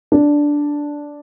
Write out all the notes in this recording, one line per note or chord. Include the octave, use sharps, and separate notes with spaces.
D4